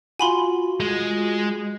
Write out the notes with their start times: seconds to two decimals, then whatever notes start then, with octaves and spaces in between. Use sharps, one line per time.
0.19 F4 F#4 G#5 B5 C6
0.80 G#3